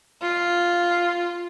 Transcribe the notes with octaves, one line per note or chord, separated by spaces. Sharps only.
F4